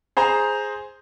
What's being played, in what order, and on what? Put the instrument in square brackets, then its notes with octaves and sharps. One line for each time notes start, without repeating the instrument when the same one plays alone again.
[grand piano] G#4 C5 A#5 C6